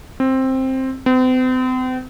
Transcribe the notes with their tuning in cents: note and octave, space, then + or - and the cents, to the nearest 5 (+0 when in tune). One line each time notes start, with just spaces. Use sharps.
C4 +10
C4 -40